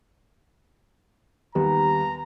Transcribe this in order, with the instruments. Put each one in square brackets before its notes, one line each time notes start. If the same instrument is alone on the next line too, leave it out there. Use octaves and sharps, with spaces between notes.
[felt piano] D#2 G3 B3 [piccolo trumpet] A#5